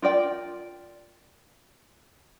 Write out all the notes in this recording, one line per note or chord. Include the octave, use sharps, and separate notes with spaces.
F4 A#4 D5 G5